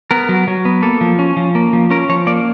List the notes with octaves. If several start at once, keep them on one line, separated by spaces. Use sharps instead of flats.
B3 A#4
F#3
F#3
B3
A#3 A4
F3
C#4
F3
A#3
F3
C#4 A#4
F3 C#5
A#3 D5